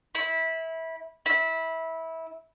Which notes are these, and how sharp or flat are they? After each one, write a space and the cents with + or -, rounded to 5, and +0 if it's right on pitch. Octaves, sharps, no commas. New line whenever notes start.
E4 -20
E4 -20